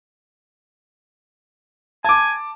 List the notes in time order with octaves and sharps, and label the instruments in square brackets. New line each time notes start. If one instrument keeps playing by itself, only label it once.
[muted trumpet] G#5 [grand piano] A5 D6